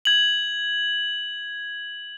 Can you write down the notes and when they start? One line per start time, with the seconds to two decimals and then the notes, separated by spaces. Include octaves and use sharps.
0.05 G#6 F#7